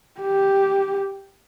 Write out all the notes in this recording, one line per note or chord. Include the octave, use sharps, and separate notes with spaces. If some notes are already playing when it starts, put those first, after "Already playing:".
G4